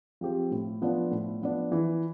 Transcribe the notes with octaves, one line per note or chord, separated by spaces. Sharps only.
F3 C4 G4
A2
F3 B3 D4
A2
F3 B3 D4
E3